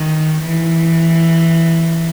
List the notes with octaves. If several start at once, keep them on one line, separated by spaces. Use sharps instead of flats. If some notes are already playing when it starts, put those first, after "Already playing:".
Already playing: D#3
E3